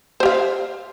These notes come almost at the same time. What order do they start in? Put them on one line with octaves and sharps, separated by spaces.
C5 G4 F5